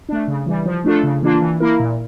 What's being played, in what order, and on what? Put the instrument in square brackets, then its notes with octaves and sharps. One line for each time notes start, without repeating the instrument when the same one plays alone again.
[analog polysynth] A3 D4
C#3
E3 G3
F3
A3 D4 F4 A4
C#3
E3 A#3 D4 F4
E3
A#3 E4 A#4
A#2